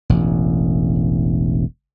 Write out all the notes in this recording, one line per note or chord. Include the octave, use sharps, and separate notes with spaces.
E1 A1